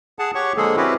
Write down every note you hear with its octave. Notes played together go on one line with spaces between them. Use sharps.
G#4 F#5 A5
G4 C#5 F#5 C#6
D3 F3 G#3 A#3 G#4 A4
C4 C#4 E4 F#4 G4 B4